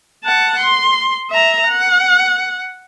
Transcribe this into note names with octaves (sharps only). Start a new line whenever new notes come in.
F#5 A5
C6
E5 A#5
F#5